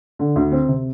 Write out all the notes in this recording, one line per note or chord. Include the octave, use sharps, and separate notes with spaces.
D3
D2
C4
C3